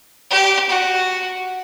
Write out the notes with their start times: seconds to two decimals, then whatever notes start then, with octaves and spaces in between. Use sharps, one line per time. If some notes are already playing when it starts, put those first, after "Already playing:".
0.30 G4
0.69 F#4